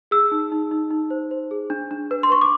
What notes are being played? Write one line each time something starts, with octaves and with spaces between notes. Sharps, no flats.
G#4 E6
D#4
D#4
D#4
D#4
C5
C5
G#4
D4
D4
B4
C6
B4 C#6
D6